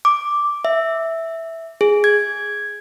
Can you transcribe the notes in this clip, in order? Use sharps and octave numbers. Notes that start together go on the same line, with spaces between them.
D6
E5
G#4
G#6